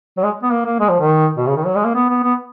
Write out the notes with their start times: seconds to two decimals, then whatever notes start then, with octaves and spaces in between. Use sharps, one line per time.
0.18 F#3
0.23 G#3
0.43 B3
0.52 A#3
0.66 A#3
0.80 G#3
0.89 F3
1.00 D#3
1.37 B2
1.47 C#3
1.57 D#3
1.66 F#3
1.76 G#3
1.85 A#3
1.95 B3
2.09 B3
2.23 B3